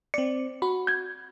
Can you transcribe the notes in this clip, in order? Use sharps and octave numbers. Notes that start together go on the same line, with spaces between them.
C4 D5 C#7
F#4 B5
G6 G#6